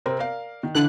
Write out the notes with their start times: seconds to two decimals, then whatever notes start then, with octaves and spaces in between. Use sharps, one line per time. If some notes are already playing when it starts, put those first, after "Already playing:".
0.06 C3 C4 A#4
0.19 A#4 D5 F5
0.63 D#3
0.75 D3 E3 F#6